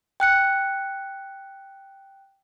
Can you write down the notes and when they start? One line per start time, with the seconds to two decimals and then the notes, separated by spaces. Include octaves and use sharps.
0.20 G5 F#6 C#7